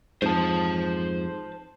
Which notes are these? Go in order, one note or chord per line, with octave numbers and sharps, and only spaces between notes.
F2 G#2 C5 A5